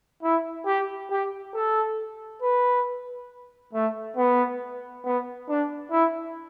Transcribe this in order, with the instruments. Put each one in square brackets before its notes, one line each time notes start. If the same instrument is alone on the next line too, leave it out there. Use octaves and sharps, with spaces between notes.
[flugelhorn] E4
G4
G4
A4
B4
A3
B3
B3
D4
E4